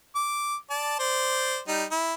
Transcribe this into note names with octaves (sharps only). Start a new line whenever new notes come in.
D6
D5 A5
C5 D5
G3 D#4
E4